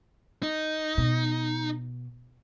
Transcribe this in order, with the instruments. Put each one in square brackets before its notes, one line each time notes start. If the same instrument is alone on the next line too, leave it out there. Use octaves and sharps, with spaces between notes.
[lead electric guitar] D#4
[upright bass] B2